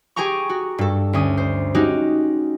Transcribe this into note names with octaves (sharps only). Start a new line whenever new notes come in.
G4 G#4 G5 G#5 A#5 C#6
F#4
G2 A4
D2 C#4 D#6
C5
G#3 C#4 D#4 F#4 G4